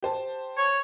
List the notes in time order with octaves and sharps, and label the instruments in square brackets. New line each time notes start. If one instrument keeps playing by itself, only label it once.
[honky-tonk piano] G4 C5 A5
[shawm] C#5